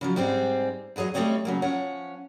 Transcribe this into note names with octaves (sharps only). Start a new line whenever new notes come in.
C#3 F3 F#3
G#2 G3 C4 G#4 C5
E2 F#3 G#4 C#5 D#5
G3 A3 B3 C4 C#5 D#5
C#3 F#3 A#3
F3 C#4 C#5 F#5